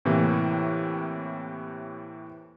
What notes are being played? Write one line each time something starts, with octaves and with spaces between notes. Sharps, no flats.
A2 C3 E3 A#3